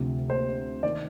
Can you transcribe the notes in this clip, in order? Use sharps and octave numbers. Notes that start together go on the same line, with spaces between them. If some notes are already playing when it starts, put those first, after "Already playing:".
Already playing: D2 C3 F3
C5
D#3 D5